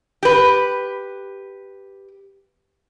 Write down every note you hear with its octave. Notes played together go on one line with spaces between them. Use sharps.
G4 B4